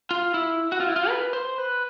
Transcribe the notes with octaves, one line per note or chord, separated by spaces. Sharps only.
F4
E4
F#4
F4
E4
F4
B4
C5
B4